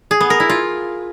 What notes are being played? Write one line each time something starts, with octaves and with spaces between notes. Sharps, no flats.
G#4
B3
A#4
E4
F4